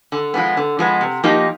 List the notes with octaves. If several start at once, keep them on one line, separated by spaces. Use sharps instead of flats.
D3
F3 G#3 B3
D3
F3 G#3 B3
C3
F3 A#3 D#4 G4